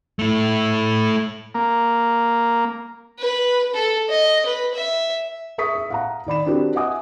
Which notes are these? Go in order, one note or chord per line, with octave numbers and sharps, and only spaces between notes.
A3 E4
A#3
B4
A4
D#5
B4
E5
G#4 E5 C#6 D#6 B6
E5
F5 F#5 A#5
D#3 D5 B5 E7
C4 D4 F#4 G4 A#4 B4
D#5 E5 F#5 G#5 D6 D#6